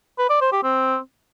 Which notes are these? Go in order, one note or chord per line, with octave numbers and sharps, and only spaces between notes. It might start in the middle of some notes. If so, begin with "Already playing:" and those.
B4
D5
C5
G4
C4